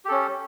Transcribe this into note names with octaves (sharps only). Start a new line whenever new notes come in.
C#4 G4 A4